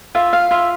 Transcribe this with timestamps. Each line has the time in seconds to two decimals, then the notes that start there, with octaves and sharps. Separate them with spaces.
0.15 F4 E5
0.33 F5
0.51 F4 E5